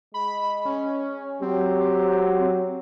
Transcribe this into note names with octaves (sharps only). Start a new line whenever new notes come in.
G#3 B5
C#4
F#3 C4 G4